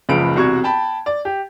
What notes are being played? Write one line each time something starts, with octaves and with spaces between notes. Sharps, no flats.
F#1 C#2 F3 B4 D7
E1 C2 F#4 C#6 G#6
G5 A5 B5
D5
G4